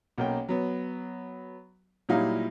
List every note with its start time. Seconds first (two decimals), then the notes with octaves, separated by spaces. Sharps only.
0.18 B1 A#3 C#4 G5
0.48 F#3 B3
2.09 A#2 F#3 G3 D#4 E4 F5